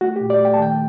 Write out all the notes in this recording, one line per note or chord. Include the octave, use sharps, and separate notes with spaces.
A3 F#4
G4
A#2
D5
A3 G5
A5
D#3 G5